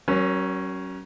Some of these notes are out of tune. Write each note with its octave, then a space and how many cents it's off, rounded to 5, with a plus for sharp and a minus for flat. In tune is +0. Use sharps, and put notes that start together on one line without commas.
F#3 +35 C#4 -10 A#4 +25